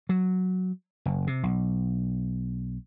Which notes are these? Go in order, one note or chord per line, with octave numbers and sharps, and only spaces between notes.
F#3
F#1
C3
B1